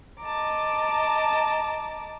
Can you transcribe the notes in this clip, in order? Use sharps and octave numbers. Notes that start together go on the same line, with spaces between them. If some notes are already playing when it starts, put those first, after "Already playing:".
D#5 A5 A#5 D6